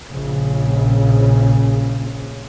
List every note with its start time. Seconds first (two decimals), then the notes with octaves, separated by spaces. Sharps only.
0.11 A#1 C#3